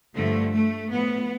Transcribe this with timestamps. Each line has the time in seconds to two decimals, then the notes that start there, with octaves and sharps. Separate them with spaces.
0.16 G2 D3 F3 A3
0.53 A3
0.90 A2 F3 B3